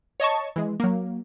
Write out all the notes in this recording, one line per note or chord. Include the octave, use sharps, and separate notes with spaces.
C#5 D#5 A5 C#6
E3 G#3
F#3 A#3